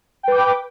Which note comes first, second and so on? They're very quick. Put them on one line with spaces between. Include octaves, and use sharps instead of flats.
G5 B4 D6